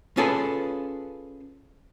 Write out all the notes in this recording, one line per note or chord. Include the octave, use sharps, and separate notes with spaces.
C#4 F4 G#4 A4 B4